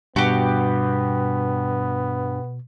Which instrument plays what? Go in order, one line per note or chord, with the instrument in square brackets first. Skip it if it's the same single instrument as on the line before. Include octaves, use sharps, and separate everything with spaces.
[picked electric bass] G2 [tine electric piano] B2 [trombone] B3 [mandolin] F#4 G4